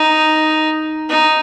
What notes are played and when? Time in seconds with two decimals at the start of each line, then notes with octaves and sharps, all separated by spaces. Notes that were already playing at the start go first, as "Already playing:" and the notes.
Already playing: D#4
1.09 D#4